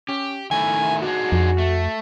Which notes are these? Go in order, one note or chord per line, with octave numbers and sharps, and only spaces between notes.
C#4 G4
D#3 A3 E4 G#5
D4 D#4 F#4 G#4
F2
A3